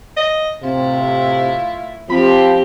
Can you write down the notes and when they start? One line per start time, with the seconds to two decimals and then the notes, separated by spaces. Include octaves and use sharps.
0.17 D#5
0.63 A2 C3 E4 F4
2.10 F3 C4 G4 B5